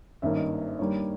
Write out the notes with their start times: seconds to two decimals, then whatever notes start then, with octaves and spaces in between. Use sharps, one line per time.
0.22 G#1 G2 D#3 A#3 C#4 E5
0.37 D#5
0.79 G2 D#3 G3 A#3 C#5